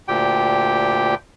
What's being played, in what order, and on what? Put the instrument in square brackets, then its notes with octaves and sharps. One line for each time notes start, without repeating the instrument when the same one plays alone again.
[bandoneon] D2 A#2 G4 G5